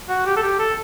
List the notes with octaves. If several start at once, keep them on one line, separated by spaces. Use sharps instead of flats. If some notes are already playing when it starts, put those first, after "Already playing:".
F#4
G4
A4
G4
A4